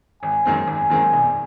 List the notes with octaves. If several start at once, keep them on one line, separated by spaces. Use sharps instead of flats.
G#1 G#5
F#2 D#3 G#3 C4
G#1 G#5
F#2 D#3 G#3 C4
E1